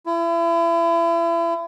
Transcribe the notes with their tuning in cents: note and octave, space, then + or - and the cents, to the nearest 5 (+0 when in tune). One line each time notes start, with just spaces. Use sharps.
E4 +35